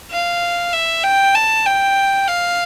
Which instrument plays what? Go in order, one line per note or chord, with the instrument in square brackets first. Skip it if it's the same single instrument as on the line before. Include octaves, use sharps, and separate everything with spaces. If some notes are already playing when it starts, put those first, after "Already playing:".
[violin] F5
E5
G5
A5
G5
F5